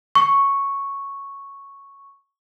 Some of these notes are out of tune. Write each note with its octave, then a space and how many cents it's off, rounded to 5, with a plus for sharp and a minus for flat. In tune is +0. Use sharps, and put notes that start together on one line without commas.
C#6 -5